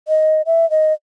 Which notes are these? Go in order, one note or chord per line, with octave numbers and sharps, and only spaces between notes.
D#5
E5
D#5